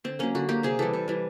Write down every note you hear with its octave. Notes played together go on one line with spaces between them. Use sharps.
D3 C4
F#3 A#3 C#4
D3 F#4
F#3 A#3 G4
C3 G#4
E3 G3 A4
C3
E3 G3